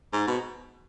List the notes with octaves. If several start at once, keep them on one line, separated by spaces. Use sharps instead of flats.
G#2
B2